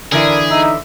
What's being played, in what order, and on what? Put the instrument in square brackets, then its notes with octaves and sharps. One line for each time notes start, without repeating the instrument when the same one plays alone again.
[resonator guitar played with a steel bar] D3 E3 E4 [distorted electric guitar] G#4 [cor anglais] A#4
[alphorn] D#4 [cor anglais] E5